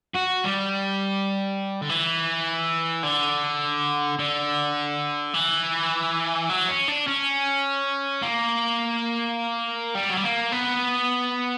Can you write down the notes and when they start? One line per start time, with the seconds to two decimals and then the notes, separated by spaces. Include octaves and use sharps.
0.15 F#4
0.44 G3
1.82 D3
1.89 E3
3.03 D3
4.19 D3
5.34 E3
6.50 F#3
6.69 C#4
6.88 D4
7.07 C#4
8.22 A#3
9.95 G3
10.10 F#3
10.17 G3
10.24 A#3
10.52 B3